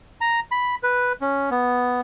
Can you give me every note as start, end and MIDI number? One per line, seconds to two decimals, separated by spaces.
0.21 0.40 82
0.51 0.75 83
0.83 1.13 71
1.21 1.50 61
1.51 2.01 59